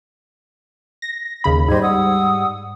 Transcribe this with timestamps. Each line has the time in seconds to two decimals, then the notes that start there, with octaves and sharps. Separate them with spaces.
1.02 A#6
1.44 D#2 C#3 B5
1.68 G#2 G3 C5 D#5 G#6
1.82 F#5 D#6 E6